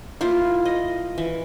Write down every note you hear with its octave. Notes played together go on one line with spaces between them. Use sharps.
A#3 E4 F4
D#5
E3